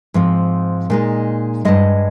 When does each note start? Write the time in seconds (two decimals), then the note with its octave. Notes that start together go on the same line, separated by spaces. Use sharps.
0.14 G#2 F3 C4
0.90 A#2 G#3 D#4
1.65 G2 D#3 G#3 D#5